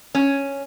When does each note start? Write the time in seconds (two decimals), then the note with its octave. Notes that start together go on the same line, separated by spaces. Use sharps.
0.15 C#4